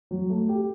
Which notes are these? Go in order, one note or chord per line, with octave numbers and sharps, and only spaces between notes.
F#3
A3
G4